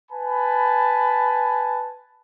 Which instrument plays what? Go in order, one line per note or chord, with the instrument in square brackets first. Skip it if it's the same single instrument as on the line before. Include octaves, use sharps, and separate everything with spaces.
[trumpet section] B4 G#5 A5 B5